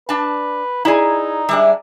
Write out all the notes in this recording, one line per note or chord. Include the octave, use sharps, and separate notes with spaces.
D4 B4 A5
D#4 E4 G#4 D5 A#5
G3 G#3 D4 E4 G4